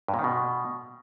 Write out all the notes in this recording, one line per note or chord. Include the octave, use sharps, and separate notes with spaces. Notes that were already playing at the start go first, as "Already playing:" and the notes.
G2
A#2
D#3
B2